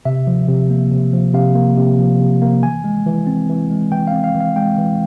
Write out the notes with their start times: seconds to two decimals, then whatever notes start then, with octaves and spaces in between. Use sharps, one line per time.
0.05 C3 E5
0.27 F3
0.48 C3
0.70 A#3
0.92 C3
1.13 F3
1.34 C3 F5
1.55 A#3
1.77 C3
1.99 F3
2.20 C3
2.42 A#3
2.63 E3 G#5
2.84 G#3
3.06 E3
3.27 C4
3.49 E3
3.70 G#3
3.91 E3 G5
4.07 F5
4.13 C4
4.24 F5
4.35 E3
4.41 F5
4.56 G#3 G5
4.78 E3